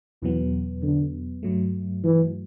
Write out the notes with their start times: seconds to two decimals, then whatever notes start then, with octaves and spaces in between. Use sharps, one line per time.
0.22 E2 B2 E3 F#3 B3
0.83 D3
1.43 G2 F#3 A3
2.04 E3